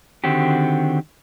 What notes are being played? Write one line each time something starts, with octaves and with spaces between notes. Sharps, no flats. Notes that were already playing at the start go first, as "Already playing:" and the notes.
D3 D#3 C4 F#4 G4